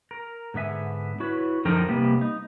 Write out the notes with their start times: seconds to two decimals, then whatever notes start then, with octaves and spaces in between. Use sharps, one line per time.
0.11 A#4
0.54 G#2 D3 B3 E5 G#5
1.20 E4 F#4 B4 C#5
1.65 F#2 D3 F3 D#4 A#4 G5
1.88 C3 G3 A#3 B3
2.21 D#4